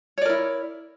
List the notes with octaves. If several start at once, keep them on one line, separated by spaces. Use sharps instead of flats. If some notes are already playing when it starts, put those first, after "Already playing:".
E4 A#4 C#5 D5